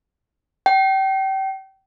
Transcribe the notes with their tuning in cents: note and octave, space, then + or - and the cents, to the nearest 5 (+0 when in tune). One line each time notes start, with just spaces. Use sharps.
G5 -30